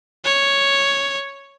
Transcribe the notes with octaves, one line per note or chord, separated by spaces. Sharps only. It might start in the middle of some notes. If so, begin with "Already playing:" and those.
C#5